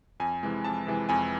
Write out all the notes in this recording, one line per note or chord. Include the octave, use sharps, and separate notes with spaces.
F2 G#5
C3 E3 G#3
F2 A5
C3 E3 G#3
F2 G#5